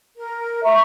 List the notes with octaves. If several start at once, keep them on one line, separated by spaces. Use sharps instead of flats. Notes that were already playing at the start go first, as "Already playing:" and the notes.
A#4
E5 A#5 C#6